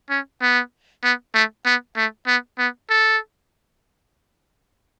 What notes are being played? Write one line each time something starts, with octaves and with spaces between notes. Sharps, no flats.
C#4
B3
B3
A3
B3
A3
B3
B3
A4